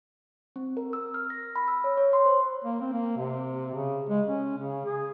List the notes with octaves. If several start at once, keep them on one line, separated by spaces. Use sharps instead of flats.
C4
A#4
E6
F6
A#6
B5
E6
C#5
C#5
C6
C5
A#3
C4
A#3
C3
C#3
G#3
C#4
C#3
G#4